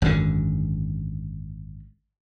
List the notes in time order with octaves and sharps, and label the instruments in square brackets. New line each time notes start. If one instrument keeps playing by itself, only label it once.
[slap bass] G#1 F#2 A2 D3